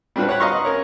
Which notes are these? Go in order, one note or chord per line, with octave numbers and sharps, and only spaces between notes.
G3 C4 D4 F4 F#4 B4
B4 C#5 F#5 B5
D#5 F5 A#5 C6 C#6
C#4 A#4 C#5